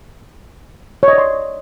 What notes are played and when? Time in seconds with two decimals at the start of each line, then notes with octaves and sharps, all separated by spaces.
1.03 C#5
1.08 D#5
1.13 D5
1.18 C6